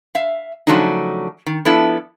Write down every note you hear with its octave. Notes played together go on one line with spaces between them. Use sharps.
E5 F5
C#3 F3 F#3 A3 D4 D#4
D#3
F3 B3 D4 E4 A4